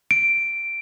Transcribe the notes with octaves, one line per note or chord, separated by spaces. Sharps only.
D7